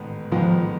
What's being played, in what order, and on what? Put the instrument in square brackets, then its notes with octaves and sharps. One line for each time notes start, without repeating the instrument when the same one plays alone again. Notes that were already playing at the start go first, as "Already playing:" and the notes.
Already playing: [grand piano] A1 G#2 D#3 G#3 B3
[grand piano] A1 G#2 D#3 G#3 B3 [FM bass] F3